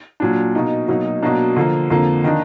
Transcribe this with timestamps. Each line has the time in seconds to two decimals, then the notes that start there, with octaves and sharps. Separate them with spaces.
0.20 A#2 F#3 D4
0.55 B2 A#3 D#4
0.88 B2 F#3 A#3 D#4
1.22 B2 F#3 A#3 D4
1.56 D3 F3 A#3
1.90 F2 D3 F3 A#3
2.24 D#3 A#3 D4